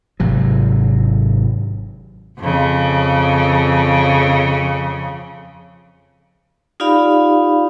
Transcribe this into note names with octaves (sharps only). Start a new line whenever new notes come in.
G#1 C3 F#3
F2 C#3
D#4 F4 G4 D5 F5 B5